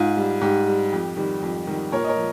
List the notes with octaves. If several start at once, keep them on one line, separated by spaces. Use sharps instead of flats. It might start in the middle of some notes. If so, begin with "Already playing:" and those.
Already playing: G#2 F4
G3
G#2 G4
G3
F2
D#3 G3
F2
D#3 G3
A#2 A#4 C#5
D#5
A#4 C#5
F3